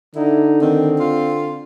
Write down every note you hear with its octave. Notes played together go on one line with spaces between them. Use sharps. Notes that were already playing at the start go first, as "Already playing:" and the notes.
D3 D#4 E4
D#3 C4
F4